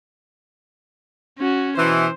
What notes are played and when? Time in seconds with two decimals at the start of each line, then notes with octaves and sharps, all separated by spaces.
1.38 C#4 F#4
1.77 B2 E3 C5